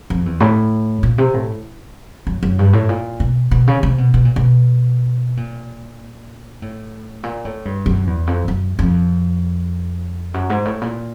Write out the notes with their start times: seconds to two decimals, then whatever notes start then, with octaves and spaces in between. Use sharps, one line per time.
0.10 F2
0.26 E2
0.40 A2
1.03 A#2
1.18 C3
1.34 A2
2.27 F#2
2.43 F#2
2.59 G2
2.73 A2
2.89 A#2
3.20 B2
3.51 B2
3.67 C#3
3.83 C3
3.98 B2
4.14 B2
4.25 A#2
4.36 B2
5.37 A#2
6.62 A2
7.23 A#2
7.45 A2
7.65 G2
7.86 F#2
8.07 E2
8.27 F2
8.48 F#2
8.79 F2
10.34 F#2
10.50 G#2
10.65 A2
10.81 A#2